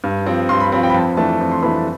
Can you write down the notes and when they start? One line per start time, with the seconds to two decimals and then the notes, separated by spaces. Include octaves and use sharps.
0.04 G2
0.26 F3 C4
0.49 G2 C6
0.60 B5
0.72 F3 C4 B5
0.83 G5
0.90 B5
0.94 F2 A5
1.17 E3 A3 D4 A5
1.40 F2
1.52 C6
1.63 E3 B5
1.65 A3 D4
1.74 A5